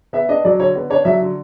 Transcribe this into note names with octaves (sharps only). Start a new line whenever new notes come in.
B3 E5
D4 D#5
F#3 D5
D3 C#5
B3
D4 C#5
F#3 E5
D3